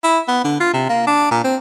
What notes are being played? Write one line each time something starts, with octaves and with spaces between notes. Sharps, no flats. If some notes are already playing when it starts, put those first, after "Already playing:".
E4
B3
D3
F4
C3
A#3
D4
A#2
C4